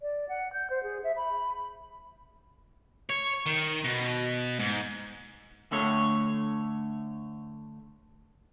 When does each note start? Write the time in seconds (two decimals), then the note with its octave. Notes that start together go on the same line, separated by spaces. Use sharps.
0.02 D5
0.29 F#5
0.53 G6
0.70 C5
0.83 G#4
1.04 E5
1.17 B5
3.10 C#5
3.46 D#3
3.84 B2
4.60 G#2
5.72 D3 A3 C#5